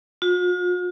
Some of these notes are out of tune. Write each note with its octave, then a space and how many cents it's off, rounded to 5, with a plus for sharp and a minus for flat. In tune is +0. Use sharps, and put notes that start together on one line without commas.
F4 +45